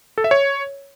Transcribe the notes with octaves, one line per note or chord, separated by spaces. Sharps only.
A4
E5
C#5